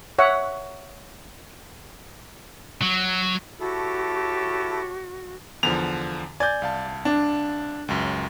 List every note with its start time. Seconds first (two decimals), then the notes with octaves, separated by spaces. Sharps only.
0.19 C#5 E5 F#5
2.81 F#3
3.60 E4 F#4 G4 A4 C#5 A5
5.63 E2 D3 F3 F7
6.40 D5 G#5 G6 G#6
6.62 C2 F5 A5
7.05 D4
7.88 C#2 F#2